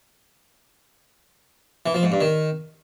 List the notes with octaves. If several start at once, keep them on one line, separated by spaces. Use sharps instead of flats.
E3
F3
G#2
G2
D#3